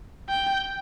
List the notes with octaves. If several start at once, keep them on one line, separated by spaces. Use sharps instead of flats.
G5